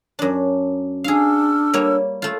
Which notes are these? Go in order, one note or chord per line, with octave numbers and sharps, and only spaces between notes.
F#2 D4
D4 G#4 F5 E6 F6
G3 A#3 C#5
A3 F4